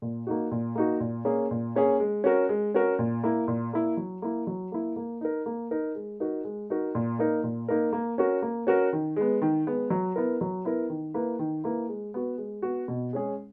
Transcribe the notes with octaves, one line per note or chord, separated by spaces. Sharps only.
A#2
A#3 D#4 F#4
A#2
A#3 D#4 F#4
A#2
A#3 C#4 G#4
A#2
A#3 C#4 G#4
G#3
C#4 F#4 A#4
G#3
C#4 F#4 A#4
A#2
A#3 E4
A#2
A#3 E4
F#3
A#3 E4
F#3
A#3 E4
A#3
D#4 A#4
A#3
D#4 A#4
G#3
D#4 F#4 A#4
G#3
D#4 F#4 A#4
A#2
A#3 D#4 A#4
A#2
A#3 D#4 A#4
A#3
C#4 F#4 A#4
A#3
C#4 F#4 A#4
D#3
G#3 B3
D#3
G#3 B3
F#3
B3 E4 A#4
F#3
B3 E4 A#4
D#3
A#3 E4 B4
D#3
A#3 E4 B4
G#3
B3 F#4
G#3
B3 F#4
B2
G#3 C#4 G#4